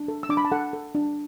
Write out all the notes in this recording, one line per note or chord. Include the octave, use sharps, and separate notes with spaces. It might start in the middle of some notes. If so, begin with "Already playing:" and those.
Already playing: D4
A4
E6
D4 D6
B5
A5
A4 F#5
A4
D4